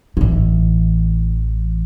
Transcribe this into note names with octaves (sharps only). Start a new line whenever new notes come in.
A1 E3